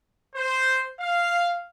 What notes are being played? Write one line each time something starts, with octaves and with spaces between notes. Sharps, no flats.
C5
F5